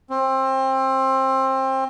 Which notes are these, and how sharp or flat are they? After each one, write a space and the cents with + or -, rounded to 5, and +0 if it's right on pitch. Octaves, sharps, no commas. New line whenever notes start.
C4 +25